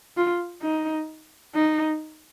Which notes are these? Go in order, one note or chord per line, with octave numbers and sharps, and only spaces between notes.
F4
D#4
D#4